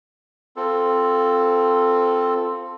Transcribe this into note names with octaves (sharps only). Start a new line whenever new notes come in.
C4 F4 A4